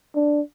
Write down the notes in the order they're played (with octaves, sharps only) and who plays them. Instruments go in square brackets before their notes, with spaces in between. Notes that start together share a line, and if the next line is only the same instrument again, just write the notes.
[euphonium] D4